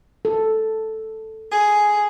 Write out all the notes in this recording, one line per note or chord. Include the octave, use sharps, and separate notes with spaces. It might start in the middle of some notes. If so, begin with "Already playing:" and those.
A4
G#4